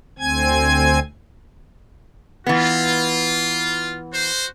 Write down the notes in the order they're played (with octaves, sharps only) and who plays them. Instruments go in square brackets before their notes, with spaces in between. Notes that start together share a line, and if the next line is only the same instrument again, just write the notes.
[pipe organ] D2 C4 G#5 G#6
[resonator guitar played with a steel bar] E3 B3 [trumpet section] F4
[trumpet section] F#4 C5